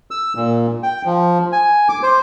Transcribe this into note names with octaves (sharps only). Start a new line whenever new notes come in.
E6
A#2
G5
F3
G#5
D6
C5